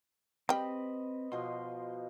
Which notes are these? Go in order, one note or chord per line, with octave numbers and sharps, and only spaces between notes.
G3 C4 B4 D#5 G5 B5
B2 F3 D#5 C6